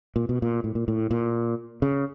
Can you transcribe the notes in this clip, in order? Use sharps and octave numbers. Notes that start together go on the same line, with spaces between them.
A#2
B2
A#2
A2
A#2
A2
A#2
C#3